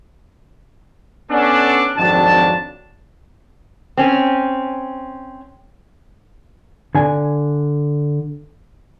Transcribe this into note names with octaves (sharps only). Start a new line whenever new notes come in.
B3 C#4 D4 A4
G#1 F2 F#3 D4 A5
C4 C#4
D3 G#5